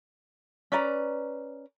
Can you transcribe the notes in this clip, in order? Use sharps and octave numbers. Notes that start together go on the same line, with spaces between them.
C#4 B4 D5 A#5